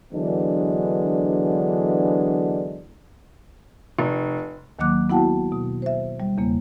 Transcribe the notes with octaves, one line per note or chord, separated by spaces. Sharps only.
D3 E3 F#3 G#3 B3 D4
F1
D#2 D#3 F#3 A#3 D6 F#6
B3 E4 F#4 F#5 G5 A5
B2
C5 E5
G3
E2 C#3 A#3